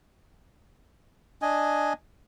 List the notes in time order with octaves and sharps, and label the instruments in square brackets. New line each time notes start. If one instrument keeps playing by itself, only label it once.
[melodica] D4 D#5 G#5